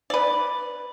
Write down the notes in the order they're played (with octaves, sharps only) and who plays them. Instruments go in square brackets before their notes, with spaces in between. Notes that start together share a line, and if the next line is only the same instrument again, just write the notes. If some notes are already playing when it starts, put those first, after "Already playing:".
[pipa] B4 D5